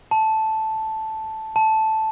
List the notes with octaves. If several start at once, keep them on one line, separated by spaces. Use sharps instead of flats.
A5
A5